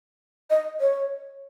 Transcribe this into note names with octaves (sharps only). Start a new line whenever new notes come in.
D#5
C#5